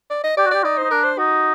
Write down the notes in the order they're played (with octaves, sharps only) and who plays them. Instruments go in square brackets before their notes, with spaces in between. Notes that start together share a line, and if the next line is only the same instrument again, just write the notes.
[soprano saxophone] D5
D#5
[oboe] G4 [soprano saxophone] D5
[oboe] F#4
[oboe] G4 [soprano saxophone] D5
[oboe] D#4 [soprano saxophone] D5
[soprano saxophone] C5
[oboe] D#4
[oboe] D4 [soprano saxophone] A#4
[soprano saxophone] C5
[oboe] D#4 [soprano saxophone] F#4